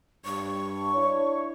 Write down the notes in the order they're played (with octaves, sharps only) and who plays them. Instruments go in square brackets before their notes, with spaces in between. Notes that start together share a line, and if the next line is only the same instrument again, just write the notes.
[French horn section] G2 [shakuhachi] C#6
[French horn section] D4 E4 C#5